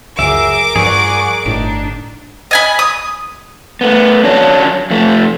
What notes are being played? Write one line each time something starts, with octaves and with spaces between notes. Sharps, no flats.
C#2 F#2 G#4 A#4 E5 D6
G2 F3 G#4 D5 F#5 G#5 C#6
G1 A2 D4 D#4
D#5 G#5 B5
D#6
A3 B3
F#3 C#4 D4
F2 A3